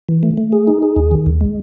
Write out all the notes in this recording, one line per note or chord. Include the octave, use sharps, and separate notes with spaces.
E3
A3
A3
G#4
D#4
G#4
D#2
D#3
D#2
G#3